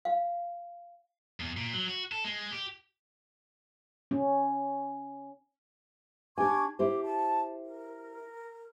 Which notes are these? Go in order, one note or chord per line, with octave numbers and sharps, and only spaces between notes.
F5
E2
A#2
F#3
F#4
A4
G#3
G4
C#4
D4 G4 G#5 C#6 D6 G#6
E4 G4 C5 D6
A5
A#4